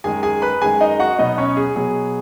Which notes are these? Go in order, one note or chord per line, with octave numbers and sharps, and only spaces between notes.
F#2 D#3 G#3 G#4 G#5
G#4 G#5
B4 B5
F#2 D#3 G#3 G#4 G#5
D#4 D#5
F#4 F#5
B2 F#3 B3 D#4 D#5
C#4 C#5
G#4
B2 F#3 B3 G#4